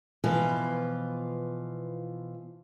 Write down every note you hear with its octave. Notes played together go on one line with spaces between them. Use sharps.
B2 E3 F3 F4